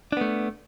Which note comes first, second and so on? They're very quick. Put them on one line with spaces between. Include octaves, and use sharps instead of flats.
D4 B3 A3